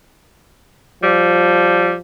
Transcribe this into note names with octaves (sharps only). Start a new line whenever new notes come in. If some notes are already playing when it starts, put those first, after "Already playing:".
F3 G3